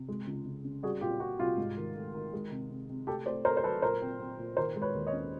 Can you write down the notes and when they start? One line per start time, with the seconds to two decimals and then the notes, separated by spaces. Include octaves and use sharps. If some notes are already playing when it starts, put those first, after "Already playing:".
Already playing: C3
0.08 G#3
0.27 C#2
0.46 C#3
0.64 C#3
0.83 G3 F#4 G#4
1.01 A#2 F4 G4
1.20 A#2 F#4
1.39 C2 F4 G4
1.58 G#2
1.77 D#3
1.95 A3
2.14 D#3
2.33 G#3
2.51 C3
2.70 C3
2.89 C3
3.07 A3 G4 A4
3.26 A3 C5 D5
3.44 A3 A#4 C5
3.57 C5
3.63 F#3 A4 B4
3.82 A#2 A#4 C5
4.01 C4
4.20 C4
4.39 A#2
4.57 D#3 A#4 C5
4.76 G#3
4.82 B4 C#5
4.95 D#2
5.07 C#5 D#5
5.13 C#4